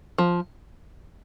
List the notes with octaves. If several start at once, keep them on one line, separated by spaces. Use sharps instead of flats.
F3